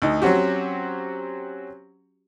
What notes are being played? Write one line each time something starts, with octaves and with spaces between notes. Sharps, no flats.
D2 D#4
F#3 C4 C#4 F#4 G4